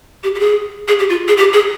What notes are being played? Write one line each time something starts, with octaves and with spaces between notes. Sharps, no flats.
G4
G4
G#4
G#4
G4
F4
G#4
G4
G#4